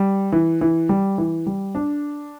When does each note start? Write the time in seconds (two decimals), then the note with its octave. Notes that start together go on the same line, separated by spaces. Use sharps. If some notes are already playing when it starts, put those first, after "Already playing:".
Already playing: G3
0.32 E3
0.61 E3
0.89 G3
1.18 E3
1.46 G3
1.75 D4